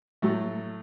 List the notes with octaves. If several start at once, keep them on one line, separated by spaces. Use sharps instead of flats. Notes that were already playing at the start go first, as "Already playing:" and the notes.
A2 F#3 A3